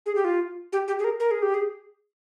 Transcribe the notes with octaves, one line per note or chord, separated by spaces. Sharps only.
G#4
G4
F4
G4
G4
G#4
A#4
A#4
G#4
G4
G#4